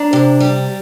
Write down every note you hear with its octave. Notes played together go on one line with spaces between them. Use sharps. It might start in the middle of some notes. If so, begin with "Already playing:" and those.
Already playing: D4 A#5
C3
G3